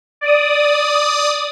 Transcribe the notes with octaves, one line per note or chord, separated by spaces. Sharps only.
D5 D#6